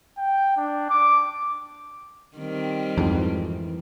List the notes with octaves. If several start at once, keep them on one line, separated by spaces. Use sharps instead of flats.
G5
D4
D6
D#3 G3 C4
F2 G#2 E3